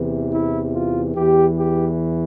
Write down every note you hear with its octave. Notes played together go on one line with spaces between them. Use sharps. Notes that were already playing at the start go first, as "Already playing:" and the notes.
Already playing: E2 C3 E3
E4
F4
E2 E3 G4
G4